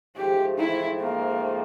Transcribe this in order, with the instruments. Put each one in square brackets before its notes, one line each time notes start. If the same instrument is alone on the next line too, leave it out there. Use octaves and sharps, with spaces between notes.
[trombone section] G#2 F3 A3 C4 [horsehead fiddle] G4
[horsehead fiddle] E4
A#3